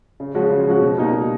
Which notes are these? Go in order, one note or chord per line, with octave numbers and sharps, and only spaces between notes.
C#3
F3 G#3 C#4 F#4
C#3
F3 G#3 C#4 F#4
B2
G3 A#3 D#4
B2